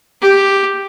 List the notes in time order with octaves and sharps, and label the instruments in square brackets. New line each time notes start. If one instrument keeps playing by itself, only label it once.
[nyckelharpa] G4